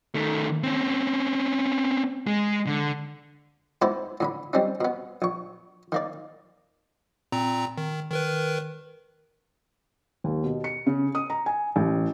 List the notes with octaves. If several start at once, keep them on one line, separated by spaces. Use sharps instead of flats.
D#3 A3
C4 C#4
G#3
D3
G#2 B3 E4 C5 D5 B5
A2 D3 B5
G3 C4 C#4 D#4
B2 B3
A#1 C#6
D#3 A#3 D5
A#2 C4 A#5
D#3
D#3 A#4 B4
D#2
B2
C#7
C#3
D#6
A#5
G#5
A1